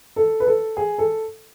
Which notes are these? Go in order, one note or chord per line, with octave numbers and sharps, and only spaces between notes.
A4
B4
A4
G#4
A4